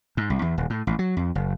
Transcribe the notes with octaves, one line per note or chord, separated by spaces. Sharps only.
G#2
C2
E2
D#1
A2
A1
F#3
F2
F#1